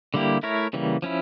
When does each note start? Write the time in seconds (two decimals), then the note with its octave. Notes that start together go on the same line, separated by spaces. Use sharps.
0.14 D3 G3 A#3 E4 G4
0.43 A3 E4 A#4 C#5
0.73 C#3 E3 G3 A#3
1.02 F3 C#4 E4